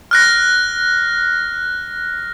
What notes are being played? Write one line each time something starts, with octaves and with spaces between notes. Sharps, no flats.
F6 F#6 A#6